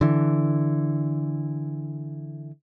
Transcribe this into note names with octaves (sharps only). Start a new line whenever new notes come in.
D3 E3